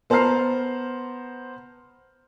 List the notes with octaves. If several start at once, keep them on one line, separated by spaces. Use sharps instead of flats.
B3 C5 A5 A#5 F6 C7